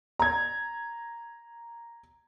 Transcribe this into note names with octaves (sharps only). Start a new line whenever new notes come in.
A#5 G#6